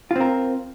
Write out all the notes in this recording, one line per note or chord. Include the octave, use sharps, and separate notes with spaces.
C4 F4 A#4